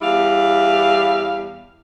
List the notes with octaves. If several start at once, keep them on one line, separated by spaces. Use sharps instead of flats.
E2 G3 E4 F5